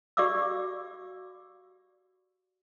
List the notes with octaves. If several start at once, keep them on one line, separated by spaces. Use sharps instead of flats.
F#4 G4 D5 F5 D6 E6